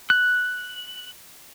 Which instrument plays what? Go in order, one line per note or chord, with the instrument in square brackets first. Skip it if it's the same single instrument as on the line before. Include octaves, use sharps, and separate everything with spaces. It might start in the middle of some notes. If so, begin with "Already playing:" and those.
[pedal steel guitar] F#6